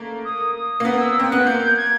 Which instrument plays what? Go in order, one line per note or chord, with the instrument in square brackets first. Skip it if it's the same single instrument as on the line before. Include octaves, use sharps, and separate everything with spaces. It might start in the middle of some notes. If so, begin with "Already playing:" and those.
Already playing: [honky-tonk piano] A3 A#3
[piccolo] D#6
D#6
[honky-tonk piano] A#3
[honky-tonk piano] B3 [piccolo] D#6
[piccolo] E6
[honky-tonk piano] C4
[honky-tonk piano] B3 [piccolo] F#6
[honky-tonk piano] A#3 [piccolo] G6
[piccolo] G#6